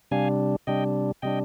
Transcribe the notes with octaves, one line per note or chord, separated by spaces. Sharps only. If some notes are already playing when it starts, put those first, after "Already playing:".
C3 G3 D4 F5 G#5
C3 G3 D4 D#5 G5
C3 G3 D4 D#5 G5